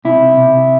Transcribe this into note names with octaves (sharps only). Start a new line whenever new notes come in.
C3 E4
C3